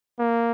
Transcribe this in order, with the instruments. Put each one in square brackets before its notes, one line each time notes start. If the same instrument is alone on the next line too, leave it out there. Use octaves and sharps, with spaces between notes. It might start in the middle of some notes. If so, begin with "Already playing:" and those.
[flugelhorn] A#3